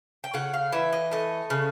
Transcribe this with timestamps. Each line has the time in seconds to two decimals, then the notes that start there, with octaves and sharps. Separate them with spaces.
0.24 G5
0.34 C#3 F#5
0.54 F5
0.72 E3 E5
0.93 D#5
1.11 A3 D#5
1.50 C#3